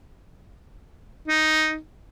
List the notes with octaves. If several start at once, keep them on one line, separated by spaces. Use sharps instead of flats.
D#4